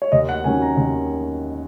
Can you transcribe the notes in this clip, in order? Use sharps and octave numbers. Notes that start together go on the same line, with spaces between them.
C#5
D#2 D#5
F#5
D#3 F#3 C#4 G#5
A#5
D#2